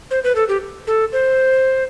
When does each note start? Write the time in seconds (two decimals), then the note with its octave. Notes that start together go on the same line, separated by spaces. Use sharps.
0.11 C5
0.24 B4
0.35 A4
0.48 G4
0.87 A4
1.12 C5